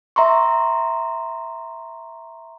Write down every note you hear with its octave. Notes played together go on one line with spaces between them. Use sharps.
E5 A#5 C6 C#6